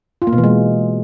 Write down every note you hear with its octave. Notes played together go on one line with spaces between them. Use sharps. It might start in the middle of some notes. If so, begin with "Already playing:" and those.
F4
A#3
B2
E3
G#3